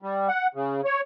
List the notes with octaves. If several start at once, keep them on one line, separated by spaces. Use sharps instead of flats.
G3
F#5
C#3
C#5